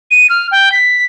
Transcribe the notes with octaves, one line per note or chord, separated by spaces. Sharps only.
D#7
F6
G5
B6